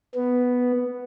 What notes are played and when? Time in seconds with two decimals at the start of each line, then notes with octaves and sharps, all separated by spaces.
0.15 B3